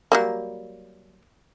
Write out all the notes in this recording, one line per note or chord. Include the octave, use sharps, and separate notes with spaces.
F#3 G3 A#3